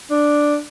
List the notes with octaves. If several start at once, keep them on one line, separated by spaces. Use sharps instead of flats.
D4